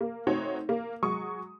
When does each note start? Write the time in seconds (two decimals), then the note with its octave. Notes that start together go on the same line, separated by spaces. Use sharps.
0.01 A#3
0.27 A3 C4 D#4 F#4 C#5
0.69 A#3
1.03 F#3 G#3 C#6 D#6